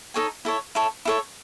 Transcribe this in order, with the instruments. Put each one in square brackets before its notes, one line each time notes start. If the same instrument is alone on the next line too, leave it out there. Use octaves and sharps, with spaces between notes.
[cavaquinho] D#4 A4 C#5 G#5
E4 A4 C#5
E4 A4 C#5
E4 A4 C#5